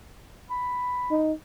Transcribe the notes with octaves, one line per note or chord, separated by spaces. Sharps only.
B5
D#4